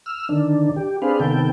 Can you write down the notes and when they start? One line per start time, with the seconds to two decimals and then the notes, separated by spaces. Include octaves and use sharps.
0.06 E6 F6
0.29 D3 D#3 D4
0.76 G4
1.02 C4 D4 G#4 B4 F5
1.20 C3 D#3 B3 A4 G5